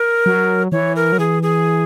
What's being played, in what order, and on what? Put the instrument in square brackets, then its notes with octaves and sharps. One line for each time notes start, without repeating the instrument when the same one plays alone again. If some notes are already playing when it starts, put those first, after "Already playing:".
Already playing: [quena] A#4
[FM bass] F#3
[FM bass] E3 [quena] C#5
[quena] A#4
[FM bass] F#3
[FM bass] E3 [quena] G#4
[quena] G#4